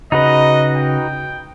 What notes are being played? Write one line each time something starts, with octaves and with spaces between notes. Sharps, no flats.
C#3 D#4 F#4 B4 D#5
G5